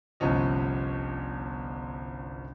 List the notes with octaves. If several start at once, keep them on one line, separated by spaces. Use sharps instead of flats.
G1 C2 F3 C#4 D#5